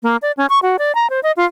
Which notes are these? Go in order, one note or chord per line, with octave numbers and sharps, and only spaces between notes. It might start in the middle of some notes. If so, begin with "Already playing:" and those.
A#3
D5
C#4
C#6
F#4
D5
A#5
C5
D#5
F4